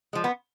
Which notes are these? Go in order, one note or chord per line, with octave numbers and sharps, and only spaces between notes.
F3 G#3
B3